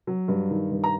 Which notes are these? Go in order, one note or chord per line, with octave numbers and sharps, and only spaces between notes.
F#3
G2
D#3
G2
A#5